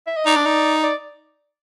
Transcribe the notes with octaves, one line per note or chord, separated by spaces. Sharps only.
E5
D#5
D#4 D5
D4
D#4
D5